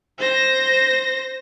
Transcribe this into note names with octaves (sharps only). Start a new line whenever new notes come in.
C5 A#6